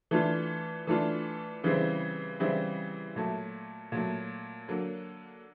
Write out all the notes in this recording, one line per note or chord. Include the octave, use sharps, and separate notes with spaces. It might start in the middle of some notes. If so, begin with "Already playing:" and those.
E3 A3 D4 F4
E3 A3 D4 F4
C#3 E3 G3 C4 E4
C#3 E3 G3 C4 E4
A#2 F#3 A3
A#2 F#3 A3
D3 F#3 A#3